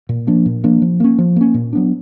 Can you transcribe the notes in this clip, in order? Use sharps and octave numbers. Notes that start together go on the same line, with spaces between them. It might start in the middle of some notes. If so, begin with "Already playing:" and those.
A#2
F3 A#3 D4
A#2
F3 A#3 D4
F3
A#3 C#4
F3
A#3 C#4
A#2
F#3 B3 D4